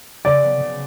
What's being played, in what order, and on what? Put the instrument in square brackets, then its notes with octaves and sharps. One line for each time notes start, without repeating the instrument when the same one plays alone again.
[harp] C#3 [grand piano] D5
[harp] F#3 B3
C#3